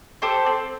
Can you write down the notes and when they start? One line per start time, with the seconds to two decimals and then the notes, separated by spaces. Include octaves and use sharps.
0.22 G4 A4 C5
0.46 C4